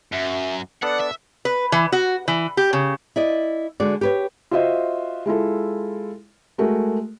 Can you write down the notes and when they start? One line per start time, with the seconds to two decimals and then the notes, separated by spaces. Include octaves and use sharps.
0.13 F#2 E5
0.83 B3 D4 A4 D5 F#5
1.01 E5
1.45 B4
1.72 E3
1.92 F#4
2.28 E3
2.57 G4
2.73 C#3
3.16 E4 D5 D#5
3.80 D3 G#3 F#4 D5
4.01 G4 B4 C#5
4.51 F4 F#4 C5 D#5 E5
5.26 G#3 E4 F4 A4
6.58 G#3 A3 F#4 G#4 A#4